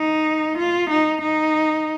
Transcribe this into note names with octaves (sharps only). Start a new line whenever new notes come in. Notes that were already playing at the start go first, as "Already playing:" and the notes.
Already playing: D#4
F4
D#4
D#4